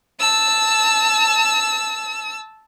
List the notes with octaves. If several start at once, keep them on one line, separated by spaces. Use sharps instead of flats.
A5 E6